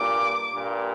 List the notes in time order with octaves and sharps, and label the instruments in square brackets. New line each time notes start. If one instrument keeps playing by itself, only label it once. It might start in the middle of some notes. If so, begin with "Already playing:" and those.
Already playing: [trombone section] G2 A#2 [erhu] D6
[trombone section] G2 A#2